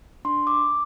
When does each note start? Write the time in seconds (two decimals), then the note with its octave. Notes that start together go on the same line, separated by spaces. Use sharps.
0.25 D4 C6
0.47 D6